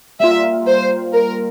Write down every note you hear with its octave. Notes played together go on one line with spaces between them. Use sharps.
G3 A#3 F4 E5
C5
A#4